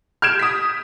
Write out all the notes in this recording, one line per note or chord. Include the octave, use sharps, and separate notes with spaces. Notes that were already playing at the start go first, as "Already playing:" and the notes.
F6 G6 G#6 D7 E7
D#6 B6